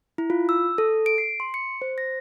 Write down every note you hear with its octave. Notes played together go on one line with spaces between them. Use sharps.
E4
F4
E6
A4
D7
C7
C6
C#7
C5
A#6